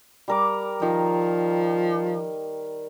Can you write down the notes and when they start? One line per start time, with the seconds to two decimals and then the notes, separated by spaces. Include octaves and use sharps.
0.28 G3 A#4 D6
0.82 D#3 F3